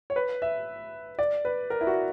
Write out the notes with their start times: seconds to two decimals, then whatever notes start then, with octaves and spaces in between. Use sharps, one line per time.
0.10 C#5
0.16 B4
0.42 E5
1.19 D5
1.45 B4
1.70 A#4
1.81 E4
1.87 F#4